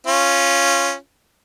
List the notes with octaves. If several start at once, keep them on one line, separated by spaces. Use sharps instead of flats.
C#4 F4